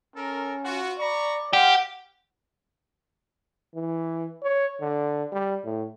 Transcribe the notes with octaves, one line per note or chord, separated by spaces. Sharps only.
C#4 A4 A#4
F4 F#4
D5 A#5 B5 C#6
G4 C5 F5 F#5
E3
C#5
D3
G3
A2